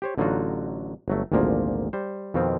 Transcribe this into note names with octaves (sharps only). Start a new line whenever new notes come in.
G4 C5 C#5
A1 D3 F#3 D#4 F4 F#4
G1 F#3 A3
G#1 D2 A#2 F3 A#3
G3 C5
F2 B2 D#3 F3 C4